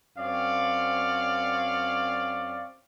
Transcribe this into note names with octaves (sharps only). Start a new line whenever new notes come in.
F#2 C4 C#5 D5 F5